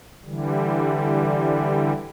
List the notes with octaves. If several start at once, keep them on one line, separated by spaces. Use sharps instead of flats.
D3 E3 G3